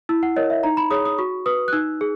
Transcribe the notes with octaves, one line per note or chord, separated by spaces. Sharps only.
E4 E6
F#5
A#4 C#5 D#5
E5
D#4 A#5
B5
G#4 C#5 D#6
D#6
F#4 C#6
B4 D#6
F#6
D#4 E6
G#4